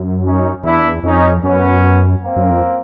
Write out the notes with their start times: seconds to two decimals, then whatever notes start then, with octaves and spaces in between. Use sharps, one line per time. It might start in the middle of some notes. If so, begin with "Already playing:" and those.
Already playing: F#2
0.23 C#4 D#4
0.63 E2 D4 E4
1.03 F2 C#4 D#4
1.43 F#2 B3 C#4
2.23 A#3 C4
2.36 F#2
2.50 F2